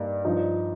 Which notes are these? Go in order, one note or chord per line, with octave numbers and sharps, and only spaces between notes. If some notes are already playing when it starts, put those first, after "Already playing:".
Already playing: G2 G3 A#3 D#4
G2 F3 D#4